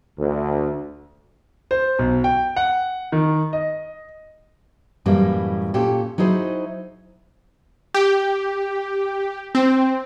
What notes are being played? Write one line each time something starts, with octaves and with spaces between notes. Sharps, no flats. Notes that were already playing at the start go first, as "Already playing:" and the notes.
D2
C5
B1
G5
F#5
D#3
D#5
F#2 A2 E3 G3 A#3
A#2 C#4 G4 A4
F#3 D#4 E4 G#4 C5
G4
C4